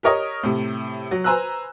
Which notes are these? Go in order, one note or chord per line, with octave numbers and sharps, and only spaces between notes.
G4 A#4 C#5 D#5
A2 C3
F#3
B4 C5 G#5 A#5 E6 F#6